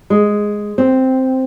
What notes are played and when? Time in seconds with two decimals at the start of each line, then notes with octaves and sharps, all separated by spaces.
0.10 G#3
0.78 C4